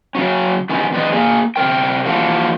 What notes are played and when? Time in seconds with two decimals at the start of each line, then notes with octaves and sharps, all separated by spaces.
0.15 C#3 F#3 C#4
0.69 D#3 E3 B3 C#4
0.93 E3 C4 B4 D5 D#5
1.12 A#3 G#4
1.56 C3 G#3 A#4 G5
2.06 E3 F3 A#3 F#4 A4